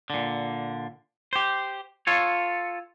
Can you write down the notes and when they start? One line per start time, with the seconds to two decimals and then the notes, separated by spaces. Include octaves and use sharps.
0.10 A#2 D3
1.33 G4 C5
2.07 F4 A4 C#5